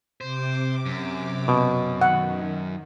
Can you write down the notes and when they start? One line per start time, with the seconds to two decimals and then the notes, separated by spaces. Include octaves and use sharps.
0.21 C3 C5 D6
0.86 F#2
1.48 B2
2.01 D#3 F#5